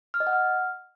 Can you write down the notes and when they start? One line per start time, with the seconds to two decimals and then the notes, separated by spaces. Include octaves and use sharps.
0.14 F6
0.20 D#5
0.27 F#5
0.33 F6